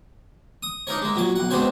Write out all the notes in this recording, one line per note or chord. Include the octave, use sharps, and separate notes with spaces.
D#6
D4 D#4 A#4 C#5
G#3 A#3
A#2 F#3 C#5
B1 F#5
G#3 B3 C4 D4 C5 C#5